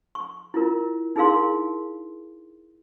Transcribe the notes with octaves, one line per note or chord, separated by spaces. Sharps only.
C#6
E4 F4 A#4
D#4 E4 G#4 A#4 F5 C6